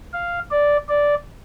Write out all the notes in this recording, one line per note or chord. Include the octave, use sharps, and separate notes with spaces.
F5
D5
D5